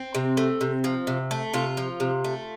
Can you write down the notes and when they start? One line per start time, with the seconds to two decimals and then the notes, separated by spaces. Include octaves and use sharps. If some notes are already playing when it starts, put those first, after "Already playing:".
Already playing: C4
0.15 C3
0.37 A3
0.61 C3
0.84 F3
1.07 C3
1.31 A3
1.54 C3 F4
1.77 F3
2.00 C3
2.24 A3